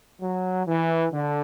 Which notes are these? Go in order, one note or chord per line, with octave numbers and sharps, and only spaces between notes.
F#3
E3
D3